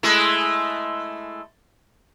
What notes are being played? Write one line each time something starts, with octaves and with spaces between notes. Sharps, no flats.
G#3 A3 E4